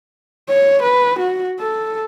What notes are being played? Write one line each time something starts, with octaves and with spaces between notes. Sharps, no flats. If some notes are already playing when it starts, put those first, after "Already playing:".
C#5
B4
F#4
A4